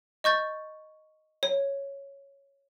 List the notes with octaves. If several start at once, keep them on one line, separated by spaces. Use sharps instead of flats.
D#5 C#6 G6 A6
C#5